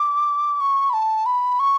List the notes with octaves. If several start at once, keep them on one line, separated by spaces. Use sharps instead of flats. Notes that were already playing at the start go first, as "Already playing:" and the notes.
Already playing: D6
C#6
B5
A5
B5
C#6